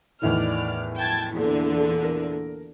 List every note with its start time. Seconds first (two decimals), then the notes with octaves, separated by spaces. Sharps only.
0.22 E2 A2 D#3 D5 F6
0.99 G5 A5 G#6
1.34 E2 A#2 D3
2.03 A#4